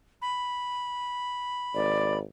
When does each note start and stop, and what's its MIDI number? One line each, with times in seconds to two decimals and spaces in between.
0.22 2.18 83
1.75 2.21 32
1.75 2.14 74